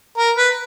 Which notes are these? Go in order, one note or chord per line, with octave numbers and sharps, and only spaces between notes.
A#4
B4